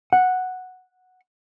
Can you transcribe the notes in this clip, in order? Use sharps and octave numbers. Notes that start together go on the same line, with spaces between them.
F#5